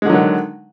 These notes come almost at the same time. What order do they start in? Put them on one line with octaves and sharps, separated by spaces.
G#3 D3 F#3 D#3